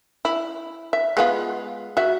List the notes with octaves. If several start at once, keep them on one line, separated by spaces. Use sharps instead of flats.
E4
E5
G#3 B3 F4
F#4 E5